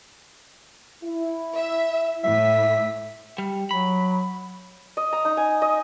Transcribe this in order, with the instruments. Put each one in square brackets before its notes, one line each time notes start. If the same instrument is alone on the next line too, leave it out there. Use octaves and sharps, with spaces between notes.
[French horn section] E4
[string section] E5
[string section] A2 B6 [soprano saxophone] E5
[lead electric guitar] G3
[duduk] F#3 [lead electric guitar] B5
[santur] D#5
A#5
D#4
G#5
D#5